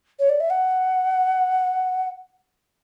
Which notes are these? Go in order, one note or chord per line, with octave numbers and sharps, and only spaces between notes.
C#5
D5
E5
F#5